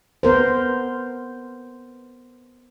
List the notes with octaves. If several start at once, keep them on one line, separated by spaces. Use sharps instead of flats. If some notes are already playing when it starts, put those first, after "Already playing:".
B3 A#4 C5